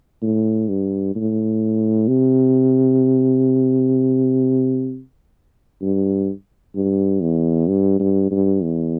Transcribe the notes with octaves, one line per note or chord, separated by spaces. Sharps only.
A2
G2
A2
C3
G2
G2
E2
G2
G2
G2
E2